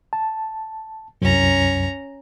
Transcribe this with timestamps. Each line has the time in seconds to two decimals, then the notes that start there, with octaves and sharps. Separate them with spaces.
0.13 A5
1.22 C2 F#2 C#4 A#5